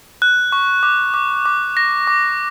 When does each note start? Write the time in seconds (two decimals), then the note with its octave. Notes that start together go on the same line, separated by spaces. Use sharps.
0.22 F#6
0.52 C#6
0.83 D6
1.14 D6
1.46 D6
1.77 A#6
2.07 D6